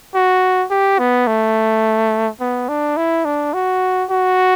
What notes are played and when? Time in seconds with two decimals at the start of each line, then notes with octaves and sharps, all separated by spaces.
0.15 F#4
0.71 G4
0.99 B3
1.27 A3
2.41 B3
2.69 D4
2.97 E4
3.25 D4
3.54 F#4
4.11 F#4